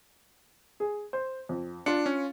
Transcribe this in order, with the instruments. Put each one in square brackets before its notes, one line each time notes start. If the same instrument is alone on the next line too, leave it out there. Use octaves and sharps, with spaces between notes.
[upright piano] G#4
C5
F2
[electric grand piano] D4 [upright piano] F4 C#7
[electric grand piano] C#4